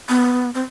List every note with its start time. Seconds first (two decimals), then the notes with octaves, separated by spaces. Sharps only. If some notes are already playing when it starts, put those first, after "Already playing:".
0.09 B3
0.54 C4